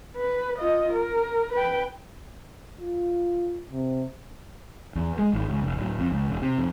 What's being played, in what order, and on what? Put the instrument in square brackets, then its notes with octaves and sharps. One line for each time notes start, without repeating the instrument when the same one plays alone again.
[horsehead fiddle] B4
F4 D#5
A#4
B4 G5
[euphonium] F4
C3
[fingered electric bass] E2
G#3
G#1
C#2
F1
D1
F2
C#2
E1
C3
F2